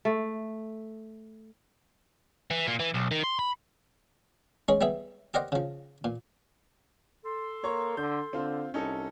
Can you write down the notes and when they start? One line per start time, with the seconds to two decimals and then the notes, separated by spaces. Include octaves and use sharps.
0.05 A3
2.51 E3
2.67 A#2
2.80 E3
2.94 B1
3.11 D#3
3.24 C6
3.39 B5
4.68 G#3 C#4 G#4 C#5
4.81 G3 B3 G#4 E5
5.34 G4 A#4 C5 D5 D#5 F#5
5.52 C#3 F3
6.04 A#2
7.25 A4 C6
7.64 A#3 C#5 A#5 C#6
7.97 D3 G6
8.33 D3 C4 F4 C5
8.74 C2 C#4 D#4 A4